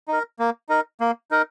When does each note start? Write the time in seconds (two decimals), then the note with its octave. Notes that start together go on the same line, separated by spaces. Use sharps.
0.08 D#4 A#4
0.39 A#3
0.69 D#4 A#4
1.00 A#3
1.31 D#4 A#4